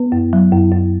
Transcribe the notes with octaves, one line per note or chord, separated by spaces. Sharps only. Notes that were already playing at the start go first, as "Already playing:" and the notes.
Already playing: B3 B4
F#2
F#3
F#2
F#2